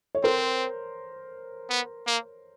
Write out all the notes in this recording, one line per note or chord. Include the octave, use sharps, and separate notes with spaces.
C#5
C4 A#4 C5
B3
A#3